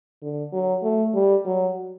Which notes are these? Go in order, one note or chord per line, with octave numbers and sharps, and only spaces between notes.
D3
F#3
A3
G3
F#3